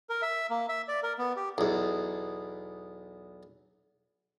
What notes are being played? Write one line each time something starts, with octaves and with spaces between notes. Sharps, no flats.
A#4
E5
A#3
E5
D5
A#4
B3
G4
B1 E2